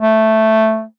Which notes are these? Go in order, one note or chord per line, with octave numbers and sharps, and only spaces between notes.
A3